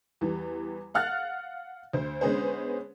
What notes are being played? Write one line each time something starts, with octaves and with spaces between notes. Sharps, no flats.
E2 E3 G3
F5 F#5 F6 F#6 A6
D2 C5
D3 G#3 B3 C#4 G#4 C5